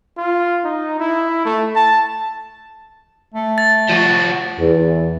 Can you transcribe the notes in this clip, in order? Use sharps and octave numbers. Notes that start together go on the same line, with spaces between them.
F4
D#4
E4
A3
A5
A3
A6
F3 F#4
E2